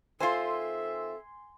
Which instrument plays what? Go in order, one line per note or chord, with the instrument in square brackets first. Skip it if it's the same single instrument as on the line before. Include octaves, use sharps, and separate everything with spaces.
[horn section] D#3 C4 E5 [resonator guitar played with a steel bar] F4 C5 [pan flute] A4 [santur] G#5 C6